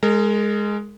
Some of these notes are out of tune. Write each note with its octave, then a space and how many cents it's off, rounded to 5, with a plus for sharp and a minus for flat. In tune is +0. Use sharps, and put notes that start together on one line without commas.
G#3 +0 A#4 -35